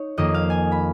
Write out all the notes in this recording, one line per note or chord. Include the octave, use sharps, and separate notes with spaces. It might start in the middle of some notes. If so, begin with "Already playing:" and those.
Already playing: D#4 C#5
F2 D#3 A#3 D#5
F5
G#5
B5